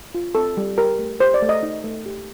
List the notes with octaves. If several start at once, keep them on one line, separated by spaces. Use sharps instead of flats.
F4
C4 A4
G3
G4 A#4
A3
G4 C5
D5
A3
D#5
D#4
A3
G4